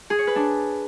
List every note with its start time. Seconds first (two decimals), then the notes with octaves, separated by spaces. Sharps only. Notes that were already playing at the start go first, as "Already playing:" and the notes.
0.10 G#4
0.19 C#5
0.27 B4
0.36 D4